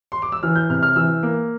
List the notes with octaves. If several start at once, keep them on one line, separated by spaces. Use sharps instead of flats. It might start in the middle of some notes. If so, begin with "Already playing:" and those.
C6
D6
E6
E3 F6
G6
C3 F6
F6
E3 E6
A#3